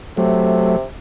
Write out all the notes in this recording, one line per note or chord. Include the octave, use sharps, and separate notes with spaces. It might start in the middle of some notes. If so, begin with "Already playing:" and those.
C3 F#3 A3